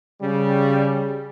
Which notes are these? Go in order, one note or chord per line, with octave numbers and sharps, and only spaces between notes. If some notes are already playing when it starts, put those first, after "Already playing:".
C#3 G3